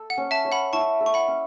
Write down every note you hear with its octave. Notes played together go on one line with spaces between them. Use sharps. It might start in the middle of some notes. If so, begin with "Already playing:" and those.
Already playing: A4
F#5
C#4
E5 A5
C#5
F#5 B5
E4 A5 C#6
A4
C#6
F#5 B5
C#4